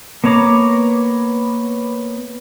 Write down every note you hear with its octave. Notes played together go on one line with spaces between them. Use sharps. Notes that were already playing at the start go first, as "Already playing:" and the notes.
A#3 B3 C#5 A#5 D6